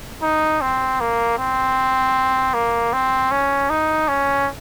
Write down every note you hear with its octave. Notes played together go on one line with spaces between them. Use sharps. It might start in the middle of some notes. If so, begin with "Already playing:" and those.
D#4
C4
A#3
C4
A#3
C4
C#4
D#4
C#4